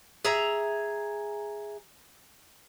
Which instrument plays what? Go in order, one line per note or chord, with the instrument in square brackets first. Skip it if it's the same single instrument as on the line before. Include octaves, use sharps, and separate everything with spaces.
[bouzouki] G#4 E5 A#5